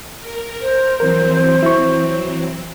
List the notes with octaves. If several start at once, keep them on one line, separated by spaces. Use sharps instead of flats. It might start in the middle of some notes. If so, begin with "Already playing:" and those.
A#4
C5
E3 F#3 C4 A#4
E4 C#6